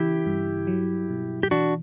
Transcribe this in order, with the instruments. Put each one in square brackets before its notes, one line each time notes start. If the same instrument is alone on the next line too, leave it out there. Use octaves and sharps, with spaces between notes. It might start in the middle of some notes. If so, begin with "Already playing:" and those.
Already playing: [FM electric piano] C#3 E3 [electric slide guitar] E4 G4
[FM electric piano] G2
F#3
B2
[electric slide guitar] G4
[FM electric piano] E3 [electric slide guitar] D4 F#4